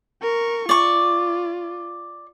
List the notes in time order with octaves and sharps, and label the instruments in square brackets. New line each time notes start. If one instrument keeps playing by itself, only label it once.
[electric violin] A#4 C#6
[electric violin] F4 [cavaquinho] D5 C#6